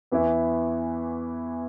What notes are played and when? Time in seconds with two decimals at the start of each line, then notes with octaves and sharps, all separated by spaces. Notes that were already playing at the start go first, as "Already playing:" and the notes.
0.12 E2 E3 B3 E4